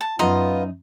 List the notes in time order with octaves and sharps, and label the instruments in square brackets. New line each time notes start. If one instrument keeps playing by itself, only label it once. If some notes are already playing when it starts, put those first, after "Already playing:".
[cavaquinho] A5
[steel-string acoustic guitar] F#2 D#4 [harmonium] B3 F4 [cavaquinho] D#5 A#5 C6